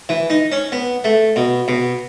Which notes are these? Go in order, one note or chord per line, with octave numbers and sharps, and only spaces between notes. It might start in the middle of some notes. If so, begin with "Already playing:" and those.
E3
D#4
C#4
B3
A3
B2
B2